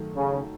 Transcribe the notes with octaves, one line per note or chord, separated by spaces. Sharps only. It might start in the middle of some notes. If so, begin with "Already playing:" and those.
Already playing: D#3 F#3 A3
C#3